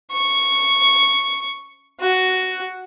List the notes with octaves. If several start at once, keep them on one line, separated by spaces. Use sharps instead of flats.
C#6
F#4